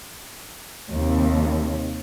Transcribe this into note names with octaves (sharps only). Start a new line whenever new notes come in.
D#2 C3